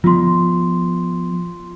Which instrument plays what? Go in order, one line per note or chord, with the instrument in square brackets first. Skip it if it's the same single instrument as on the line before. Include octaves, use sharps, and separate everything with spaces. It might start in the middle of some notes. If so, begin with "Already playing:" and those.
[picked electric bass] F3 B3 [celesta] F4 C6